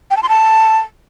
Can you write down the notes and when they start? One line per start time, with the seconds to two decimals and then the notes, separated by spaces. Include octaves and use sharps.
0.11 G5
0.17 A5
0.23 C6
0.29 A5